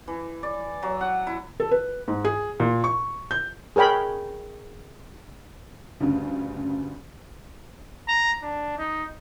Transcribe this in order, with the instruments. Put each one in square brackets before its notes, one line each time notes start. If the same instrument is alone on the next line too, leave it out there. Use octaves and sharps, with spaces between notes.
[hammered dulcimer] E3
D5
F#3
F#5
E4
[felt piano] A4
B4
G#2
G#4
A#2
C#6
G6
[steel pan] G#4 A#4 C#5 G5 B5
[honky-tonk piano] D2 G2 C#3
[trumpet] A#5
D4
D#4